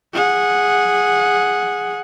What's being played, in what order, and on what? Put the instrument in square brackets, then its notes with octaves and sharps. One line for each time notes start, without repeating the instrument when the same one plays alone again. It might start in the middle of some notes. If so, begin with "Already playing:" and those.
[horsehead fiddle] G#4 F#5